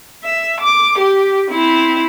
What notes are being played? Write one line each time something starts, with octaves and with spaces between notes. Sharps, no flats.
E5
D6
G4
C4 E4